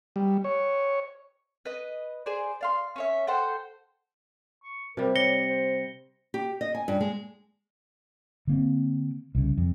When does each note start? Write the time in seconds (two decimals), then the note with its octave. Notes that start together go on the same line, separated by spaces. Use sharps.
0.16 G3
0.44 C#5
1.65 B4 D#5
2.26 G#4 C5 D5
2.61 D5 F5 C6
2.96 C#4 C#5 E5
3.27 A4 C5 F#5 G5
4.63 C#6
4.97 C3 G3 A#4
5.16 C#5 A#6 C#7 G7
5.48 C5
6.34 G4
6.61 D#5
6.75 G#5
6.88 G2
7.01 G#3
8.47 D3 A#3 C4
9.35 C2 C#3
9.58 F2